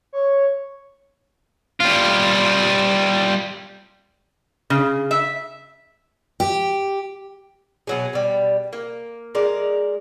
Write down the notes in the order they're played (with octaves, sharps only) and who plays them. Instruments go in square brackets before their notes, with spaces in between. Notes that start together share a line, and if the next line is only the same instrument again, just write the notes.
[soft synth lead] C#5
[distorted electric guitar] G3 F4
[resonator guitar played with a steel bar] C#3
E5
[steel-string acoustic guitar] G4
[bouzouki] B2 F#3 G#4
B2 G3
A#3
G#3 A#4 D5